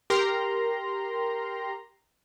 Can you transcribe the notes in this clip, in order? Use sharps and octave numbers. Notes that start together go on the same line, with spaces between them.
G4 A#4 A#5 C6